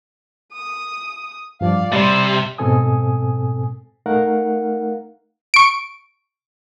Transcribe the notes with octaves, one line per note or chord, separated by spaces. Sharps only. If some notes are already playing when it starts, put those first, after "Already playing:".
D#6
G2 F3 D5 F5
C3 G3 D5 C6 A6
G#2 B2 C4 A4 G#5 D#6
A3 D#4 A#4 F5 F#5
C#6 D7